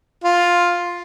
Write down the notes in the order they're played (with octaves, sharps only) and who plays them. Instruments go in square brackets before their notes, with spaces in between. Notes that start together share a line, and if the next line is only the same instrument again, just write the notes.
[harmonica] F4